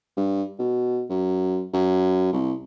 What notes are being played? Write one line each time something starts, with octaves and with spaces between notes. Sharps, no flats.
G2
B2
F#2
F#2
C2